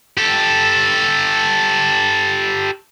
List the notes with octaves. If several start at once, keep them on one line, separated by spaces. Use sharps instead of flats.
G4 A4